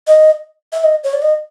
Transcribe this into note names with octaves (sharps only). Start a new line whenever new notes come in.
D#5
E5
D#5
C#5
D5
D#5